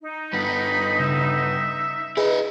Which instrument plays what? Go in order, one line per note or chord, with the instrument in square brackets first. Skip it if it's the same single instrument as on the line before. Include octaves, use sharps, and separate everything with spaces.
[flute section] D#4
[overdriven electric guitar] G2 B3 [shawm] B5
[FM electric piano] C#3 [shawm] E5
[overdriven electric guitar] E4 D#5 [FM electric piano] G#4 B4